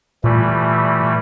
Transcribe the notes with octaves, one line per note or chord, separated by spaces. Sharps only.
A#2 E3 G3 A3